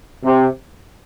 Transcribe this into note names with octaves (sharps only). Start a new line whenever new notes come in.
C3